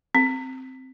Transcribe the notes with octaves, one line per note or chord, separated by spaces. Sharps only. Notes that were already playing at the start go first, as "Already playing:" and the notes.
C4